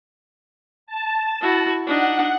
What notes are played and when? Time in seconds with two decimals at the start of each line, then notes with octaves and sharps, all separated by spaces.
0.87 A5
1.41 E4 F#4
1.87 D4 D#4 F#5